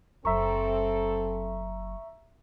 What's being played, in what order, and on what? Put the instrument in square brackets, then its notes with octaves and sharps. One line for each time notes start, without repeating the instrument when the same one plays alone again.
[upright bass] F#1 F#3 [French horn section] C4 A4 [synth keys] E5 A#5 C#6